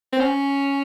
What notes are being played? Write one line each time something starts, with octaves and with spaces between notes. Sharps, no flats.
C4
C#4